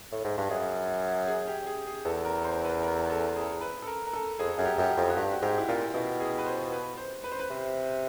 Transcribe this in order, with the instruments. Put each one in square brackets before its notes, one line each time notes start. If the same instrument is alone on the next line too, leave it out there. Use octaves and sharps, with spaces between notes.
[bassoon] A2
G#2
G2
[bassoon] F#2 [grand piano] G#4
[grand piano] G#4
G4
G#4
G#4
[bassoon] E2 [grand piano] A4
[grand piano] A#4
C5
B4
A#4
A4
G#4
B4
A4
A#4
A#4
A4
[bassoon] F2 [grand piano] G#4
[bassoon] F#2 [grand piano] G#4
[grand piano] G4
[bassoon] F#2 [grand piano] G4
[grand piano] F#4
[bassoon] F2
[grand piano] F#4
[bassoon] G2 [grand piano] G4
[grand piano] F#4
[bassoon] G#2 [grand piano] G4
[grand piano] E4
[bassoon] A#2 [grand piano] F4
[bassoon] B2 [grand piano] E4
[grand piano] G#4
B4
C5
B4
C5
B4
C5
B4
[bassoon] C3